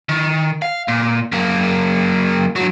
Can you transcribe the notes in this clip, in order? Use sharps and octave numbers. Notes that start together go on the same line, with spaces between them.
D#3
F5
A#2
F#2 A#3
G2 F#3